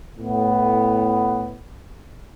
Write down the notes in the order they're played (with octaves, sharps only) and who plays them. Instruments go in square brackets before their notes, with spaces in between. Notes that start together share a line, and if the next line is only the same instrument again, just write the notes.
[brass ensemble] A2 B3